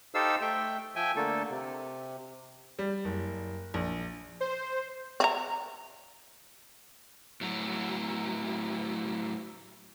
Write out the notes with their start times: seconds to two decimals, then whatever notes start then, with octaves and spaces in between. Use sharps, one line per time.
0.15 D#4 G4 A4 C5 F5 E6
0.41 A3 E5 G5
0.96 F3 E5 G5 G#5
1.16 D3 A3 A#3 A4
1.51 C3
2.79 G3
3.05 F#1
3.74 A#1
4.41 C5
5.20 C4 E5 A#5
7.41 A2 F#3